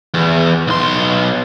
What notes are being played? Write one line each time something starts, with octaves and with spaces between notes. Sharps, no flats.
E2
B1 C6